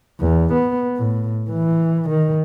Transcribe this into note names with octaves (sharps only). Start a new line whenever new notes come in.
E2
B3
A2
E3
D#3